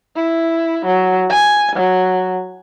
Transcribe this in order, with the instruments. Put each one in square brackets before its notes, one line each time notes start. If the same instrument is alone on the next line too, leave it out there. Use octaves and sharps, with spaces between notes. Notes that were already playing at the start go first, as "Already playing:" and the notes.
[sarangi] E4
F#3
G#5
F#3